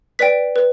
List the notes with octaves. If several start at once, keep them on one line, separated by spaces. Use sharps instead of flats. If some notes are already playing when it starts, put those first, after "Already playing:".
B4 D5 G5 B6
B4